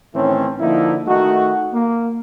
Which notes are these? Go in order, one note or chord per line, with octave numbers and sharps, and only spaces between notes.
A2 D#3 E3 A3 C4 C#4
D3 F3 A#3 D#4 E4
D#3 A3 D#4 F#4
A#3